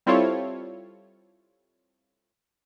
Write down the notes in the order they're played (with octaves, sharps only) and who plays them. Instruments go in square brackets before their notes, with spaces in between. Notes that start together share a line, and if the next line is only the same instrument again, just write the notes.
[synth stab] G3 C4 E4 F4 A4 C#5